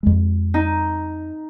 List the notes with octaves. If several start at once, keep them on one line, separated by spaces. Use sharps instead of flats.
F2 G#3
D#4